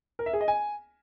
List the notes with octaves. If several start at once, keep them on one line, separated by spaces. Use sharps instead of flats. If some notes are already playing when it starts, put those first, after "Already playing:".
A#4
E5
G#4
D#5
G#5